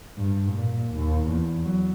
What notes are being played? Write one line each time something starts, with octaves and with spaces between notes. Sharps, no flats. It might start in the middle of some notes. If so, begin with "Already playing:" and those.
G2
A#2
D#2
E2
F#3